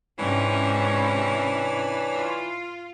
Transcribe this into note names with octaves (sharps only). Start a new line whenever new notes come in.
G#2 C3 E3 C#4 D4 C#5
F4